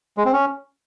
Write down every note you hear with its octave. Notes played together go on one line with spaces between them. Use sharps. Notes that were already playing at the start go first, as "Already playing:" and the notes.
G#3
C4
C#4